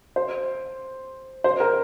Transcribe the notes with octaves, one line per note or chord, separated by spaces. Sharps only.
C5
C5
A#4